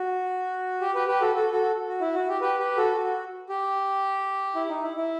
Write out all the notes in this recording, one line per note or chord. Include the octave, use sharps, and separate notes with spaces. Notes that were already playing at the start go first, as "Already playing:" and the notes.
Already playing: F#4
G4
G4 B4
G4 B4
F#4 A4
F#4 A4
F#4 A4
F#4
E4
F#4
G4
G4 B4
G4 B4
F#4 A4
F#4
G4
E4
D#4
E4
E4